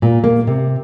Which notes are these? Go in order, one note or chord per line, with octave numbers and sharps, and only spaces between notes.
A#2
A#3
C3